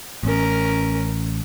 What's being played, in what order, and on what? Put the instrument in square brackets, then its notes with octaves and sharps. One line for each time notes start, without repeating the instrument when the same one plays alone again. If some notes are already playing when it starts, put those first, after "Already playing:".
[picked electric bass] A1 [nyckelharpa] C#4 A#4